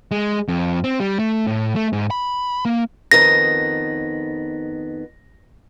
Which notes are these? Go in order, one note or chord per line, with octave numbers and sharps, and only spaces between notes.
G#3
F2
C4
G3
A3
A2
A3
G#2
B5
A#3
F2 D#3 B3 A#6